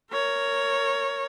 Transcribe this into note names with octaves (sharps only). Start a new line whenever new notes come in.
A#4 C#5